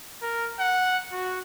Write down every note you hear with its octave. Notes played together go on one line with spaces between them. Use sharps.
A#4
F#5
F#4